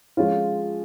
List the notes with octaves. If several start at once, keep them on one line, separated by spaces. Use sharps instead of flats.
F3 G#3 C#4 F4